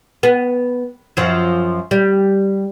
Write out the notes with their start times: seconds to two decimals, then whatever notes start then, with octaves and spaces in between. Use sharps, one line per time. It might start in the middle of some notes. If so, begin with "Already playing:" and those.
0.23 B3
1.17 F#2 F3
1.91 G3